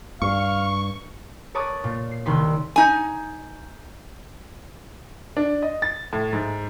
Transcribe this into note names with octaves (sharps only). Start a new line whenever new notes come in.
G2 F5 C#6
A#4 B4 C#5 A5 D6 D#6
A#2
C7
C2 D#3 B4 C6 B6
D#4 G#5
D4
D#5
A6
A2
G#2